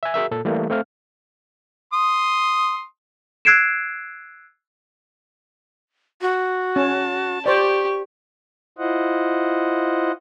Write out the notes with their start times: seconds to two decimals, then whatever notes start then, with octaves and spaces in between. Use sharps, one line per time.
0.03 E5 G#5
0.14 F#4 G#4 A#4 E5
0.31 A#2 A4
0.45 E3 G3 A3 A#3
0.70 A3 C4 F5 F6
1.93 C6 D#6
3.45 E6 F#6 G#6 C7 D7 E7
6.22 F#4
6.76 C#4 A5
7.46 G4 C5 D5 C#6
8.78 E4 F4 C5 D#5 F#5